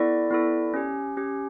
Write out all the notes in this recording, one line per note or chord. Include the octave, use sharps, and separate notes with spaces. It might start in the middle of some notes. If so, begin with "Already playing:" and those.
Already playing: B3 E4 A4 D5
B3 E4 A4
C#4 G4
C#4 G4